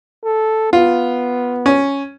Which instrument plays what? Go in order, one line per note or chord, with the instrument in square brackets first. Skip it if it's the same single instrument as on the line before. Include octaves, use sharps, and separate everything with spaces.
[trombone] A4
[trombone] B3 [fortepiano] F4
[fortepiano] C#4